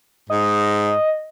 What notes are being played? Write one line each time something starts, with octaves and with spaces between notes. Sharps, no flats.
G#2 D#5